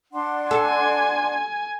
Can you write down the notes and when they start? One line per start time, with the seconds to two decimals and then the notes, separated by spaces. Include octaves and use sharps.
0.13 D4 F#5 C6
0.51 A4 G#5